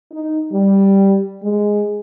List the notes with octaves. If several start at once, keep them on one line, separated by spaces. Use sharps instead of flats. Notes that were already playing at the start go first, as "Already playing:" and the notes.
D#4
G3
G#3